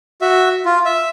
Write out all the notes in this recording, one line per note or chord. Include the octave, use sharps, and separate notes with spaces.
F#4 E5
F4
E5